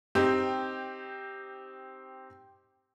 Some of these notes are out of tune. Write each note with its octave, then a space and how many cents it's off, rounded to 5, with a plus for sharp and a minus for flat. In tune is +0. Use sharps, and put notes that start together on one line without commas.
C4 +0 D#4 +0 G4 +0